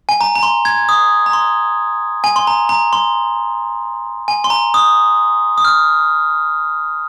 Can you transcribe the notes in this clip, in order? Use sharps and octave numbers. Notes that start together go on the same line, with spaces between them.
G#5
A#5
A#5
C6
G#6
D#6
A#5
C6
G#5
C6
A#5
A#5
C6
G#5
C6
A#5
D#6
D#6
F6